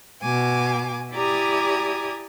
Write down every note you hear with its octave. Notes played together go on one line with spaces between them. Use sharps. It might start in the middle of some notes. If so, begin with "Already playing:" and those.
B2 G#5 D6
E4 G4 D5 G#5 A#5 D#6